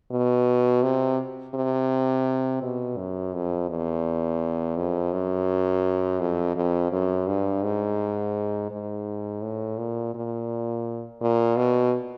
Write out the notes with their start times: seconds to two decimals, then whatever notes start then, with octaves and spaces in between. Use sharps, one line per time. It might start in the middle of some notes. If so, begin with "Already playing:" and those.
0.12 B2
0.83 C3
1.55 C3
2.62 B2
2.98 F#2
3.34 F2
3.69 E2
4.77 F2
5.13 F#2
6.20 F2
6.56 F2
6.92 F#2
7.27 G2
7.63 G#2
8.71 G#2
9.42 A2
9.78 A#2
10.14 A#2
11.22 A#2
11.57 B2